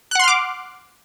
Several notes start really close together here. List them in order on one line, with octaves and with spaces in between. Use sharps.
F#6 F#5 C6 F6 D6